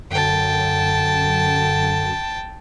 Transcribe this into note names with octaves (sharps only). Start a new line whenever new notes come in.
F#2 D3 G5 A5